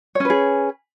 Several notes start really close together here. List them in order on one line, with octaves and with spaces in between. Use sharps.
C#5 C#4 B4 G#4